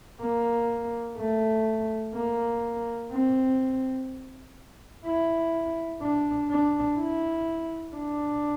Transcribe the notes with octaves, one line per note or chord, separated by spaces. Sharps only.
A#3
A3
A#3
C4
E4
D4
D4
E4
D4